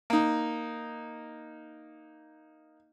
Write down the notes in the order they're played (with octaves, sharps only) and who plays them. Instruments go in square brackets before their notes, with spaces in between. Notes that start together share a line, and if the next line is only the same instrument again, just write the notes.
[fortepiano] A#3 D#4